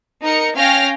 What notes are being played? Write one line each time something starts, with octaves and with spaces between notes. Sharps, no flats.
D#4 A#4 C#7
C#4 F5 G5 F6 A#6